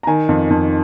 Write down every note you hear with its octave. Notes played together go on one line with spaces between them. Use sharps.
A#5
D#3 G#5
F2
F2